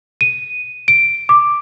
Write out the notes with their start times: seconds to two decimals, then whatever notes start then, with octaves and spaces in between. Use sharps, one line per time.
0.21 D#7
0.88 D7
1.29 D6